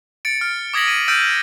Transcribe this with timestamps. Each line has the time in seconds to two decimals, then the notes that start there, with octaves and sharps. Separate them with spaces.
0.25 A6 C#7 D7
0.41 F6
0.74 D6 D#6 G#6 A#6 B6 F#7
0.87 D#7
1.08 E6 F6 G6 A6 D7 D#7
1.21 F6